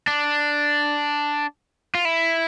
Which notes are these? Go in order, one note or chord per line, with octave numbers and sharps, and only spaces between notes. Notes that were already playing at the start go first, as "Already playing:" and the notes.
D4
F4
E4